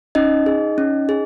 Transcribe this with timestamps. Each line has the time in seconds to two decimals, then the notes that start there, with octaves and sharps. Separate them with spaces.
0.15 C#4 D#4 D#5
0.46 G#4
0.78 C#4
1.09 G#4